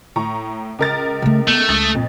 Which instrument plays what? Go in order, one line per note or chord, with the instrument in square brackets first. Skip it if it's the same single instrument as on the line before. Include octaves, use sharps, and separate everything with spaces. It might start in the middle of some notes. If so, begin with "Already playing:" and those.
[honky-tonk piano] A2 A#5 C#6
C#2 A#4 A6
[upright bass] C#3 A3
[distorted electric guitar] A3 [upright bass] B3
[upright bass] C#2 [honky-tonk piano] D#6 A6
[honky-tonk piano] F2 [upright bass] A#2